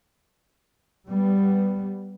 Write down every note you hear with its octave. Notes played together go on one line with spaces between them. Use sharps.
G3 B3